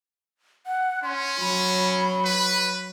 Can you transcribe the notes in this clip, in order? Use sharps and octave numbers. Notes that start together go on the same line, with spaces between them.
F#5
C#4 C6
F#3 B5
B4